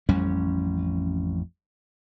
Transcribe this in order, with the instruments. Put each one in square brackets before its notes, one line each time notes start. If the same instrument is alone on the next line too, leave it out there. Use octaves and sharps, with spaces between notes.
[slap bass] A1 F2 G3 C#4